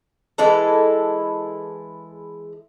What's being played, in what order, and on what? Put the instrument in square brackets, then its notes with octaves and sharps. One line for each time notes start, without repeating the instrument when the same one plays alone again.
[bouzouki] E3 G#3 E4 A4